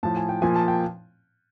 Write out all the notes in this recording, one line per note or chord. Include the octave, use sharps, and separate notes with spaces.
A2 F3 A5
G#5
G5
A#2 F3 G#5
A5
G5